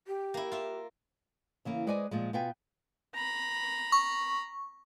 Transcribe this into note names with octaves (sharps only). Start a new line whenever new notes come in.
G4
A#3 E4
F4 E5
C#3 E3 A#3
G#3 B4 C5 D5 D#5 G#5
A#2 F3 G#3
B2 B3 F4 B4 G5 G#5
A#5 B5
C#6